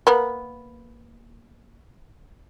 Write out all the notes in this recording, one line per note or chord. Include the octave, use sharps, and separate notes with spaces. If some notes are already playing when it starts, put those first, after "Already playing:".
A#3 B3